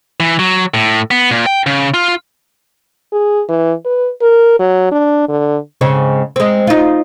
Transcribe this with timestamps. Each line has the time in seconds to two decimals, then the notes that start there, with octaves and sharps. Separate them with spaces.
0.20 E3
0.39 F#3
0.74 A2
1.11 B3
1.31 A#2
1.46 G5
1.66 C#3
1.94 F4
3.13 G#4
3.49 E3
3.85 B4
4.22 A#4
4.60 F#3
4.92 D4
5.29 D3
5.81 G#2 C#3 C4
6.36 G#3 C4
6.67 D#4 F4